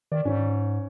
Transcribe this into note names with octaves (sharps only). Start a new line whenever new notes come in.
D#3 D5
G#2 C#4